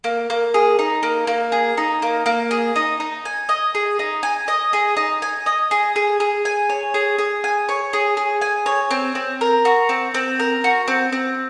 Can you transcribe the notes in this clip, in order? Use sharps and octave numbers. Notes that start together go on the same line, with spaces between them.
A#3
A#3
G#4
D#4
A#3
A#3
G#4
D#4
A#3
A#3
G#4
D#4
D#4
G#5
D#5
G#4
D#4
G#5
D#5
G#4
D#4
G#5
D#5
G#4
G#4
G#4
G#5
C#5
G#4
G#4
G#5
C#5
G#4
G#4
G#5
C#5
C4
C4
A#4
F#4
C4
C4
A#4
F#4
C4
C4